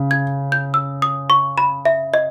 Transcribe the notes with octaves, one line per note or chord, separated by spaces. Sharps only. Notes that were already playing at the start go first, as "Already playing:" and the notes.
Already playing: C#3
G#6
G6
E6
D#6
C#6
B5
E5
D#5